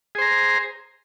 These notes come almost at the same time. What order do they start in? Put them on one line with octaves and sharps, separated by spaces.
G#4 C5 A#5